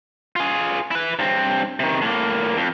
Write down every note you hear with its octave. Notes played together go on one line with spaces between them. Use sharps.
F4 G#4
E4 B4
G2 C4
C3 D#3
A2 A#3
F2